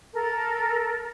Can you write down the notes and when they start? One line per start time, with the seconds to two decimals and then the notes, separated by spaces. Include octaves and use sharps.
0.13 A4 A#4